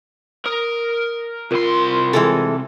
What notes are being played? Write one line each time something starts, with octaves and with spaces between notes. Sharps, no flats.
A#4 D#6
C2 F4 A#4 C6
E3 G#3 A4